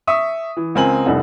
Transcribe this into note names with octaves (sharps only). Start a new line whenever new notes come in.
E5 C#6 D#6
E3
C#2 C4 A#4 G#5 A#5 F#7
F1 C2 D4 A4 F#5